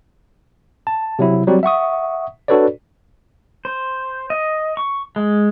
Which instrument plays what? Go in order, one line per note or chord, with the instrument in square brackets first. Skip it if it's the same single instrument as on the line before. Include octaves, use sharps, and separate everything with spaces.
[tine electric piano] A5
C3 F#3 E4
F#3 G3 C4 F#4
E5 F#5 C#6 D#6
D4 F#4 A4 B4 C#5 D5
[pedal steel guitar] C5
D#5
C#6
G#3